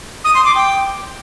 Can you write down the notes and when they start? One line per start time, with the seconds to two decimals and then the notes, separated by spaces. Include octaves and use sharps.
0.24 D#6
0.35 C6
0.45 D6
0.55 G5